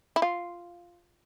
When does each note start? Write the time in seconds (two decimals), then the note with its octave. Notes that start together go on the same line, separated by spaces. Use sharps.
0.16 E4
0.22 F4